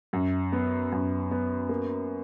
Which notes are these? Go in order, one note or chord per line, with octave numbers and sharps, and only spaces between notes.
F#2
B3
F#2
B3
A#3